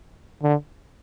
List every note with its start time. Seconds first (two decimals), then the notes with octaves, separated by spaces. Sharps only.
0.43 D3